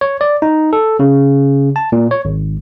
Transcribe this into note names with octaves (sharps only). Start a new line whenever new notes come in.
C#5
D5
D#4
A4
C#3
A5
A#2
C#5
G#1